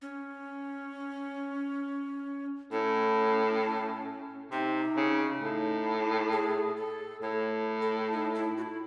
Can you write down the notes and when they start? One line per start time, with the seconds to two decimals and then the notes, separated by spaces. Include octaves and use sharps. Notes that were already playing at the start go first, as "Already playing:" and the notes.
0.02 C#4
2.71 A2 C#4
4.51 C3 D#4
4.97 C#3
5.42 A2
6.32 G#4
6.77 A4
7.22 A2 C#5
7.82 A4
8.13 D#4
8.35 E4
8.57 F#4
8.62 E4